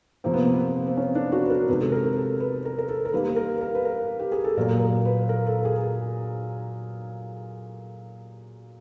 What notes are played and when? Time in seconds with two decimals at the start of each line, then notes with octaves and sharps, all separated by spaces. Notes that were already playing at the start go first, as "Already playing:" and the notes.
0.24 C3 F3 A#3 C4
0.34 B3
0.44 A#3
0.53 B3
0.87 C4
0.97 C#4
1.15 D4
1.32 F#4
1.46 B4
1.50 A#4
1.68 C3 D#3 G#3 B4
1.80 A4
1.92 A#4
2.16 A4
2.40 B4
2.65 A#4
2.78 A#4
2.89 A4
3.05 A#4
3.13 D#3 G3 A#3 B4
3.36 A#4
3.61 A#4
3.75 B4
3.85 A#4
4.20 G4
4.32 G#4
4.44 A4
4.57 A#2 F#3 A#3 A#4
4.80 A#4
5.05 B4
5.29 A#4
5.46 A4
5.65 G#4